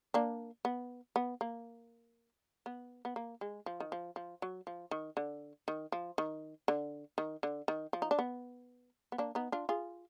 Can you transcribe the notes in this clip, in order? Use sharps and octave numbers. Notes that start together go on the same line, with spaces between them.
A#3 D4
B3
B3
A#3
B3
B3
A#3
G#3
F3
D#3
F3
F3
F#3
F3
D#3
D3
D#3
F3
D#3
D3
D#3
D3
D#3
F3
D#4
D4
B3
B3
A#3 D4
B3 D#4
D4 F4
F4 G#4